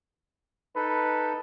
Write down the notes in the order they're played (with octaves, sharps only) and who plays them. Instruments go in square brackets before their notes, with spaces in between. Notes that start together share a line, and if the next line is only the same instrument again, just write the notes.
[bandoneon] D#4 A4 [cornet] B4